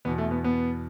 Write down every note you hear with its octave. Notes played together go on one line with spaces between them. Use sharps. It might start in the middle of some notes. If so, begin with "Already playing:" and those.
E2 B2 B3
A3
B3
B3